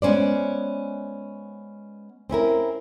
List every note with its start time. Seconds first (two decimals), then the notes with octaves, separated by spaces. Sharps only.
0.02 G#3 B3 C#4 C5 D5
2.30 C4 C#4 E4 A#4